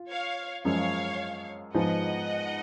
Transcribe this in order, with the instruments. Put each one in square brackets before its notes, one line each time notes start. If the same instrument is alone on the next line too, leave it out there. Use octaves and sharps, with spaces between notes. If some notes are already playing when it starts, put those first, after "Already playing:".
Already playing: [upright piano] F4
[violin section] C#5 F5
[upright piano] F#2 F3 G#3 [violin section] C#5 F5
[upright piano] G#2 F3 G#3 B3 [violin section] D#5 F#5